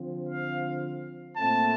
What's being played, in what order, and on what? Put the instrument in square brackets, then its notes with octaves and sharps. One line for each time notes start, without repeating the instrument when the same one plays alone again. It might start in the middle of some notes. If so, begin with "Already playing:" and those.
Already playing: [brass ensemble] D3 F3 C4
F5
A#2 A3 C4 A5